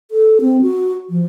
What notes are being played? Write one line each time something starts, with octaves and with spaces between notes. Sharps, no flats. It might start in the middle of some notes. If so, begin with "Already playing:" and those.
A4
C4
F#4
F3